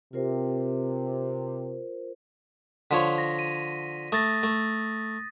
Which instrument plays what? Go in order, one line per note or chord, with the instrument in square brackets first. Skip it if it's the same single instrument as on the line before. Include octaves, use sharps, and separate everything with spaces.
[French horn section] C3 [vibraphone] F4 A#4 C5
[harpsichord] D3 F3 C#5 [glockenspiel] B6
[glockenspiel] A#6
D#7
[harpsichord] A3 [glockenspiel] D#6 A6 A#6
[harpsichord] A3